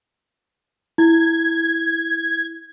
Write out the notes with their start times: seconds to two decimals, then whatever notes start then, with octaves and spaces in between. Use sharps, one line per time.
0.98 E4 G#6